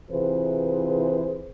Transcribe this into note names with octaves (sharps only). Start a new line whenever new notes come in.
C3 E3 F4 G#4 B4 C5